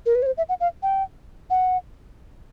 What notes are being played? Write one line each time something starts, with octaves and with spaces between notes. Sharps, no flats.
A#4
B4
C#5
C5
E5
F#5
F5
G5
F#5